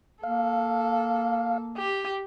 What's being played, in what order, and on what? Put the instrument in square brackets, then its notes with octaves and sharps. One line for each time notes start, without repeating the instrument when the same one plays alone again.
[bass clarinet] A#3 [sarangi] A4 [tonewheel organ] F5
[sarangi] G4